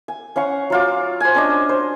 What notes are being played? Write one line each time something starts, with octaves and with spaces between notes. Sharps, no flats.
G#5
C#4 F5 F#5 C#6
F#3 F4 D6
C5 G#5
C#4 D4 D#5
C5